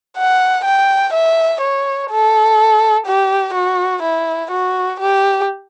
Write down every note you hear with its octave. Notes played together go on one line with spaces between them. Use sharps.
F#5
G5
E5
C#5
A4
G4
F#4
E4
F#4
G4